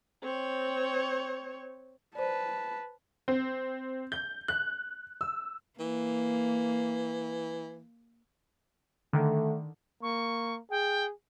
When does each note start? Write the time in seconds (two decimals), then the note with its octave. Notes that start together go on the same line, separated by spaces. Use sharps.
0.23 C4 C#5
2.15 B4 C5 D5 A5
3.28 C4
4.12 G6
4.48 F#6
5.21 E6
5.80 E3 A#3
9.13 D3 D#3 A3
10.02 A#3 C#6
10.70 G#4 G5